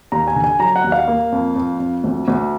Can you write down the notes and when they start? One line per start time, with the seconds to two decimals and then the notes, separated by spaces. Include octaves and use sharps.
0.12 D#2 A#5
0.28 G#5
0.35 D3
0.44 G#5
0.59 F#3 A#5
0.76 F#5
0.84 D#2
0.92 F5
1.08 A#3
1.32 F2
1.56 F2
1.80 F2
2.04 D2
2.28 D2